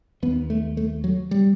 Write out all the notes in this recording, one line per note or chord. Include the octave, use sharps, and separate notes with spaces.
D#2 B3
A3
A3
F#3
G3